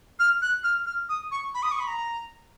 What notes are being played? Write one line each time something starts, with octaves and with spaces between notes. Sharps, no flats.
F6
F#6
F6
F6
D#6
C#6
B5
D#6
C#6
B5
A#5